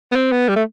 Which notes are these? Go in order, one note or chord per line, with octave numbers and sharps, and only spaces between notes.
B3
C4
B3
G3
A3